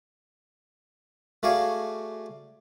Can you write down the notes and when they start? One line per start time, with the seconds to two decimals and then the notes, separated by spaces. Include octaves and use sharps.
1.43 A3 F#4 G#4 D5 F5 G#5